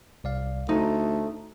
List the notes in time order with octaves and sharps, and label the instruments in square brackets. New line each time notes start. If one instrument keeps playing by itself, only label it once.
[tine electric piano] C2 D5 F5
[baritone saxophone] D2 [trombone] A3 [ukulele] D#4 [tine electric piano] C5